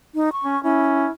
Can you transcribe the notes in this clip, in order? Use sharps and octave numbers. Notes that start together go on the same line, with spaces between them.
D#4
C#6
C#4
C#4 E4